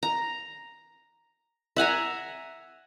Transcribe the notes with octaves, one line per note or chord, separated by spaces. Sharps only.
A#5
E5 F#5 G#5 A#5